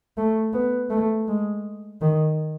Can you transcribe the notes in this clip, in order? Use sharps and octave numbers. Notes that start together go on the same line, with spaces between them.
A3
B3
A3
G#3
D#3